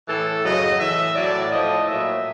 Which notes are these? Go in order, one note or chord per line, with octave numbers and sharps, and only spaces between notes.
A2 E3 A4
F#2 C#3 F#3 D#5
A2 E3 E5
A2 F#3 D5
A2 F3 D#5
A#2 F#3 E5